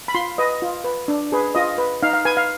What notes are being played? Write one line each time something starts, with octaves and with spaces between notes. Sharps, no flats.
B5
F4 C6
B4 D#5
F4
B4
D4
G#4 B4
F4 D#5
B4
D#4 F5
F5
B4 G#5
F5